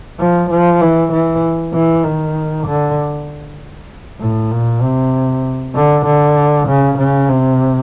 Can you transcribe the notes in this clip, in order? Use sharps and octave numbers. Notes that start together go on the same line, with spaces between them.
F3
F3
E3
E3
E3
D#3
D3
A2
A#2
C3
D3
D3
C#3
C#3
C3